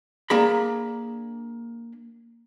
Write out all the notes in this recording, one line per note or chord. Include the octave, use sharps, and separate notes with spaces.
A#3 D4 G#4 G5 A#5 B5